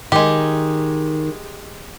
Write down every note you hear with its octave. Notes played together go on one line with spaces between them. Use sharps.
D#3 G#3 G4